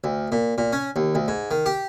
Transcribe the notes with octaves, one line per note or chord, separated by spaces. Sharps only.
D2
A#2
A#2
C#4
D#2
D2
G#2
D#3
G4